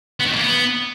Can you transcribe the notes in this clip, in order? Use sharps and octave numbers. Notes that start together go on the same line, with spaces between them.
B3
D#3
F2
A#3
B3